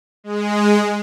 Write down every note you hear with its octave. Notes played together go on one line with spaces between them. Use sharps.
G#3